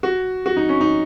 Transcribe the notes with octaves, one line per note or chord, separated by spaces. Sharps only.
F#4
F#4
D#4
C#4
D#4